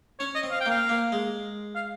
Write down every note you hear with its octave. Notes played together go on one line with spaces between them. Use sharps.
C#4 C#5
D#5
C4
F5
G5
A#3 F5
A#3
G#3
F5